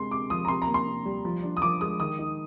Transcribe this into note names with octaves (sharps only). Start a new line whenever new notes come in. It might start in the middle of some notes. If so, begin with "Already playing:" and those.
Already playing: C3 G#3 C6
C3 D6
F3 D#6
A#5
C3 C6
A#5
A#3
C6
C3
G3
F3
D4
D#6
F3 D6
G#3 D#6
D#3 D#6
D#4